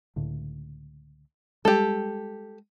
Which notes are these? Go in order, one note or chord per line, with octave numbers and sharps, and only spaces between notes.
C#2 A2 D3
G3 G#3 G4 A4